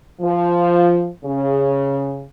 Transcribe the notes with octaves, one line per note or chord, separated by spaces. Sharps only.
F3
C#3